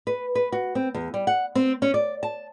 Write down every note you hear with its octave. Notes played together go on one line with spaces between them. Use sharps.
B4
B4
F#4
C4
E2
G3
F#5
C4
C#4
D5
A5